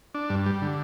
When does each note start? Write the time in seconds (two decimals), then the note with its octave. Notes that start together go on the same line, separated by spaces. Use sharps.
0.15 D4
0.30 G2
0.46 G3
0.62 D3